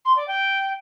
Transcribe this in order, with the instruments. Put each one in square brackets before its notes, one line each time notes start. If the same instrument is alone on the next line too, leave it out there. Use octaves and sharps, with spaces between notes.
[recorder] C6
D5
G5